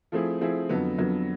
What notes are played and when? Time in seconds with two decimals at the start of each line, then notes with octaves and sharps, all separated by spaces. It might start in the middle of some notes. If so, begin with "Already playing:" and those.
0.12 F3 A3 C4 E4 G#4
0.41 F3 A3 C4 E4 G#4
0.69 F2 D3 F#3 B3
0.98 F2 D3 F#3 B3